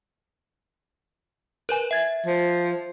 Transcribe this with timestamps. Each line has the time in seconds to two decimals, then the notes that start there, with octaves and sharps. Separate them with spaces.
1.69 A#4 B4 G#5
1.91 E5 G#6 A6
2.26 F3